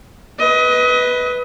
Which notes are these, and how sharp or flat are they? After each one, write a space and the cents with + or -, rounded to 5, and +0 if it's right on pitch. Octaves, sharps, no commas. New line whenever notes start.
B4 +0 D#5 +30